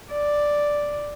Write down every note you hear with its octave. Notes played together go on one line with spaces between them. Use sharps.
D5